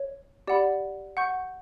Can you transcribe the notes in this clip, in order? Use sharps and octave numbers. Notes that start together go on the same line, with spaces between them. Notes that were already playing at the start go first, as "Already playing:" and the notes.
Already playing: C#5
G4 D5 F#5 B5
F#5 C#6 G6